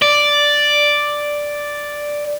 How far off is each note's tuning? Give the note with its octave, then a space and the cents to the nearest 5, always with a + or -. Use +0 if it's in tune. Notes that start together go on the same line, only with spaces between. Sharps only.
D5 +0